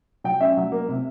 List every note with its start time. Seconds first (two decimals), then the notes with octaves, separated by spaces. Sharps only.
0.24 F#3 G5
0.40 C#4 E5
0.57 F#3
0.72 A#3
0.89 C3